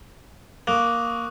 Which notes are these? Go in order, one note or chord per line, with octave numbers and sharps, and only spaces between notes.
A#3 C#6 D#6 F#6